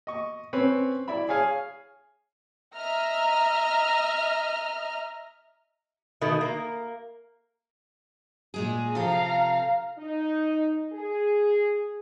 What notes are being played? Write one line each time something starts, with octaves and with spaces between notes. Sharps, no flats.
D#5 C#6
C4 C#4 B4 C#5
E4 D5 E5 B5
G#4 C#5 F5 G#5
D#5 E5 A#5 F6
B2 D#3 A3
A#3
A#2 G#3 G#4
C3 F3 A4 F5 A#5
D#4
G#4